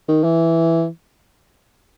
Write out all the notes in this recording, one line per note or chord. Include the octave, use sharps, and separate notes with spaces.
D#3
E3